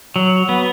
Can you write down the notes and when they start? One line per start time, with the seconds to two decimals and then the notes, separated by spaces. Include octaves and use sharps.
0.16 F#3
0.49 B3